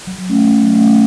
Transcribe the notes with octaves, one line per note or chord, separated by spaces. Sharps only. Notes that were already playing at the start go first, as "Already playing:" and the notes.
F#3
A3 C#4
F#3
A3 C#4